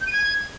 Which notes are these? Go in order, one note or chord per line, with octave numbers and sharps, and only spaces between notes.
G6
D#7
G#6